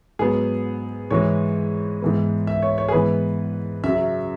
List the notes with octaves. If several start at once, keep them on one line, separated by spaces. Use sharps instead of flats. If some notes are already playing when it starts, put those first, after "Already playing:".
G#2 F#3 B3 G#4
G#2 E3 G#3 C#5
G#2 E3 B3
E5
C#5
C#5
G#4
G#2 E3 B3 B4
F#2 C#3 F#3 E5